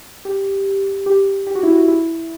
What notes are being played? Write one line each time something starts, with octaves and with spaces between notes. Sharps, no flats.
G4
G4
G4
F#4
E4
F#4
E4